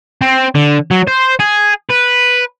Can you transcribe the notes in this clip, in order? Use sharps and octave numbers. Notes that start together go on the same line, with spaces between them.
C4
D3
F#3
C5
G#4
B4